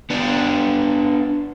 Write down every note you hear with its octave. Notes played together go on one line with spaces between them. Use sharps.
B3 D4